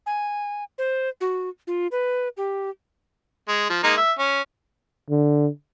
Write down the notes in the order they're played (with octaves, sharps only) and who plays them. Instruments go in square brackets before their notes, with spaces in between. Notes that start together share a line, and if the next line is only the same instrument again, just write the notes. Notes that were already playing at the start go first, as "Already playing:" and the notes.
[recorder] G#5
C5
F#4
F4
B4
G4
[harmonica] G#3
F3
G#3 A#3 D#4
E5
C#4
[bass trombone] D3